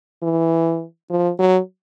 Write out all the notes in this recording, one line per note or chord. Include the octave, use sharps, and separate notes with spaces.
E3
F3
F#3